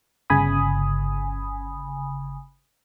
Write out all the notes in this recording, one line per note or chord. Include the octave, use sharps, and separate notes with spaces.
G1 C#3 G#5 B5 D#6